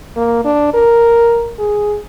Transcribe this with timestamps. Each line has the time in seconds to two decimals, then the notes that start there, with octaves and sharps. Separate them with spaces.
0.17 A#3
0.44 D4
0.74 A#4
1.59 G#4